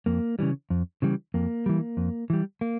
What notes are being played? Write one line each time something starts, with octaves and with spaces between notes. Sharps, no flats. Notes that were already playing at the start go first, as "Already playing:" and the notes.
F2 A#3
C#3 E3 G3
F2
C#3 E3 G3
F2 A#3
E3 G3
F2
E3 G3
A#3